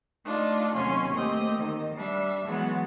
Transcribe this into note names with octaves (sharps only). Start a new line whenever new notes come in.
A3 D4 D#4 F4
D#2 C3 F#3 C#4 G#5 C6
A3 A#3 C4 G4 D#5
D#3
G3 D4 E5
E3 F#3 G#3 B3 F#4